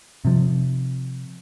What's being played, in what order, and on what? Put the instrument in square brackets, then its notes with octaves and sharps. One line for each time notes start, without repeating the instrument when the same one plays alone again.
[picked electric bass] C3 F3